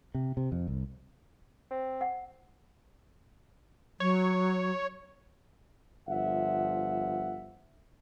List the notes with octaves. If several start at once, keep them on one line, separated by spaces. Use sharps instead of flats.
C3
C3
F2
C2
C4
F#5
F#3 C#5
G1 F3 E5 F#5